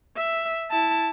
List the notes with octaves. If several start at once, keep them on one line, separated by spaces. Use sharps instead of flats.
E5
E4 A5